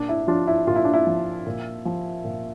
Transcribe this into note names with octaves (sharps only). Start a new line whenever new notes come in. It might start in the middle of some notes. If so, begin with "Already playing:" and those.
Already playing: A#2 D4
E4
F3 D4 F4
E4
A#2 F4
E4
D4
E4
F3
A#2
F3
A#2